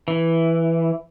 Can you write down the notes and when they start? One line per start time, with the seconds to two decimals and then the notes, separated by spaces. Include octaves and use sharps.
0.08 E3